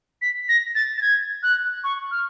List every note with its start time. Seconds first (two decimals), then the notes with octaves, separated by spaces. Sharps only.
0.22 B6
0.49 A#6
0.75 A6
0.98 A6
1.02 G#6
1.43 F#6
1.84 C#6
2.11 F6